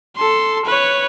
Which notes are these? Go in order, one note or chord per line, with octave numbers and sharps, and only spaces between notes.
A4 C6
B4 C#5